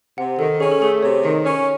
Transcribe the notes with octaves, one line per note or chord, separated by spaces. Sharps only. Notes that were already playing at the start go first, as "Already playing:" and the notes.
C3 F#5
D#3 A4
C#4 G#4
A4
A3 G#4
C3 C#5
D#3
C#4